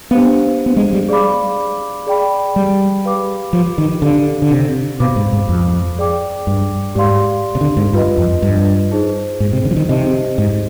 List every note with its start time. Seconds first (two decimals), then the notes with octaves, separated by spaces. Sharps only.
0.11 B3 D4 G4 C5 F5
0.66 B3
0.77 G#3
0.93 G3
1.09 G#4 D5 F5 B5 D6
2.07 G#4 D5 G5 B5
2.56 G3
3.05 G4 B4 F5 B5 D6
3.53 F3
3.78 D#3
4.02 D3 D#4 G4 D5 F5
4.42 D3
4.51 C3
5.00 B2 C5 F5 B5 D6
5.16 G#2
5.33 G#2
5.49 F2
5.98 G#4 D5 G5 D6
6.47 G2
6.95 G#2 G4 D5 F5 C6
7.55 C3
7.61 D3
7.77 G#2
7.93 G2 F4 B4 D#5
8.17 F2
8.42 G2
8.92 D#4 G#4 C5
9.40 G#2
9.53 C3
9.65 D3
9.71 F3
9.76 D#3
9.89 C3 D#4 G4 C5 D#5
10.38 G#2